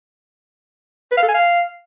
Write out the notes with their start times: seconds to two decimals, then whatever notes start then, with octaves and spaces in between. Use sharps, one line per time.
1.12 B4
1.17 F5
1.23 A4
1.29 G#5
1.34 F5